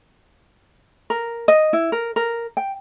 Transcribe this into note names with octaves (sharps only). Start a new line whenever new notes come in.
A#4
D#5
E4
A#4
A#4
G5